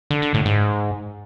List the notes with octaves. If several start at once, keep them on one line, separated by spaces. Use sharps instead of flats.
D3
D3
A2
G#2